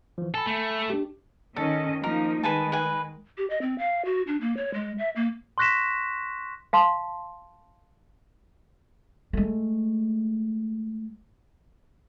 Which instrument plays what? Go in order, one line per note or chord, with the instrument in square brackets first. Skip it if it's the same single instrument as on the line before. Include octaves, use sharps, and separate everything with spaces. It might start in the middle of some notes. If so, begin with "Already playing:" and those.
[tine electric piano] E3 F3
[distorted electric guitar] A4 [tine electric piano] G#5 B5
[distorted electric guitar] A3
[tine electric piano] D4 G4
[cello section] D#3 C#4 D#5 [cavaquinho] A4
[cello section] F3 A#3 D#4 [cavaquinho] A#4
[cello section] D#3 G#3 [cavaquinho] B4 G#5 A5
[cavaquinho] B4 G#5
[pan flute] G4
D#5
C4
F5
F#4
D4
A#3
C#5
G#3
E5
A#3
[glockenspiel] C6 C#6 F#6 A#6 B6 E7
[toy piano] F5 A5 C6
[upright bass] G#3 A3